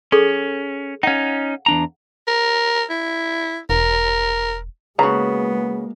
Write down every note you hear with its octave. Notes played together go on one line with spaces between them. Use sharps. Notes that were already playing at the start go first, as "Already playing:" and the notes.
C#4 G#4 A4 C#6
C#4 D#4 F5 F#5
E2 D4 A#5
A#4
E4
E1 A#4
C#3 G#3 A#3 B3 F#4 A#5